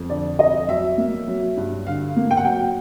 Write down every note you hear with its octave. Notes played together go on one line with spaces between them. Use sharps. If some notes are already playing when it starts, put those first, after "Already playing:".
Already playing: F2
D3 D5
F2 D#5
F#3 E5
A#3
F#3
G2
D3 F5
A#3
G5
F#5
F#3 G5